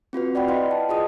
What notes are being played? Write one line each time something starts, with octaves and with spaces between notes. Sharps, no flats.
C4 F4 F#4 B4
D5 F#5 G5 B5
E4 B4 D#5 F5 C6
A5
F4 G#4 D#5 D#6